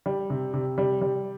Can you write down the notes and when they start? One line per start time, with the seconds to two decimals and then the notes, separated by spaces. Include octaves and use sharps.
0.06 G3
0.30 C3
0.53 C3
0.78 G3
1.02 G3